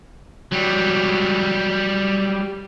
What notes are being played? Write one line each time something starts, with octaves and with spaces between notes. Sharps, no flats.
F#3 G3